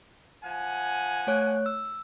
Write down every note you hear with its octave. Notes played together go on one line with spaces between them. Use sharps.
F3 F#5 G#5
A3 C#5 F#6
E6